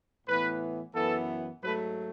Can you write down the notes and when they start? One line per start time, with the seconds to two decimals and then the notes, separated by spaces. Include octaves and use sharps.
0.27 A2 E3 B3 B4
0.94 F#2 E3 B3 A4
1.62 G#2 F#3 A3 B4